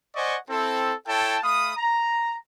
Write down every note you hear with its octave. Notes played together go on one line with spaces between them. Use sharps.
C5 D5 D#5 F#5 G#5 C#6
C4 E4 A4
E4 A4 C#5 G5 A5
A3 F5 B5 D#6
A#5